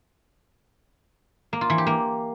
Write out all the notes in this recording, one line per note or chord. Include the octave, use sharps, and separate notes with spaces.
A#3
F4
E3
G4
A#3